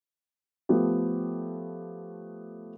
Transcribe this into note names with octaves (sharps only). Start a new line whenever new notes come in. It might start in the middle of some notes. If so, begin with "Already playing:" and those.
F3 A3 B3 G4